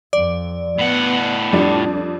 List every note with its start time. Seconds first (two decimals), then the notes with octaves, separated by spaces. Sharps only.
0.13 F2 D5
0.79 A2 B3 F#5
1.52 F2 G3 D4 D5